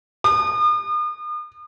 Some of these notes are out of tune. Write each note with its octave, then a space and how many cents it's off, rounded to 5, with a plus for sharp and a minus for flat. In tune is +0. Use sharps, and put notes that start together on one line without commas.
D#6 -40